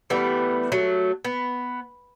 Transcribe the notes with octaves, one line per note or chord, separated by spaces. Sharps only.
E3 G3 A3 B3
F#3 A3
B3